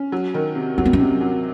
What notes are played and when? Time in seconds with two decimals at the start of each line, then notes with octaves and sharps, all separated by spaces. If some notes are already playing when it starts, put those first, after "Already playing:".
Already playing: C#4
0.12 F#3
0.34 D#3
0.55 C3
0.78 F#3 C#4
0.86 C4
0.93 C#4
1.00 C3
1.21 F#3